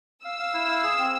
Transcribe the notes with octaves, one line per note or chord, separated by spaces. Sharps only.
F5 E6
F5
E4
F5
G#4
C4